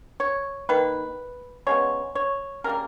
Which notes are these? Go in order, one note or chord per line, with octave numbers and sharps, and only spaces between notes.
C#5
D#3 A#3 B4
C#3 G#3 B3 C#5
C#5
C#3 G3 A#3 A#4